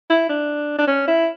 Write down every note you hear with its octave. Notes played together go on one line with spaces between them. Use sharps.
E4
D4
D4
C#4
E4